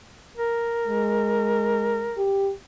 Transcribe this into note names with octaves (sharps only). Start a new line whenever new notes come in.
A#4
G#3
G4